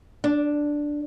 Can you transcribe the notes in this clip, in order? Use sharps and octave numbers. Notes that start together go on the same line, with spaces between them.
D4